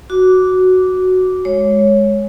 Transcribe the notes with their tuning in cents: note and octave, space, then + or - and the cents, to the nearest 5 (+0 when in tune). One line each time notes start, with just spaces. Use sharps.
F#4 +0 D6 -10
G#3 +0 C#5 +0